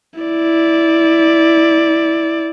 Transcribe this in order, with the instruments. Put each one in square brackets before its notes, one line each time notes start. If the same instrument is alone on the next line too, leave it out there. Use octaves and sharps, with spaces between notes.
[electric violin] E4 D5